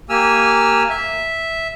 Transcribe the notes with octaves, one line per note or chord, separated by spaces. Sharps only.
A#3 G4 G#5 E6 F6
E5